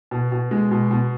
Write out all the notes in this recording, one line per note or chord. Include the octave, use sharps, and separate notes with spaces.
B2
B2
G#3
B2
B2